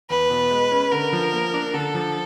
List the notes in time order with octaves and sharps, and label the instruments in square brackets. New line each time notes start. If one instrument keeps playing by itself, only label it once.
[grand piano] E2 [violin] B4
[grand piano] B2
G#3
C#4
[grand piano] D3 [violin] A#4
[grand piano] F3
A#3
D4
[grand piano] D3 [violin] A4
[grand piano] F3